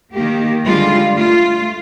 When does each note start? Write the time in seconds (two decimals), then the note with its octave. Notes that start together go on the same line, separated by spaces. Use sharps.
0.13 D#3 A#3 G4
0.65 D3 G3 G#3 F4
1.14 A3 F4